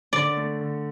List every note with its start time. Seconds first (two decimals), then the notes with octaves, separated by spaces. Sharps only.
0.13 D3 D5
0.37 A3
0.60 D3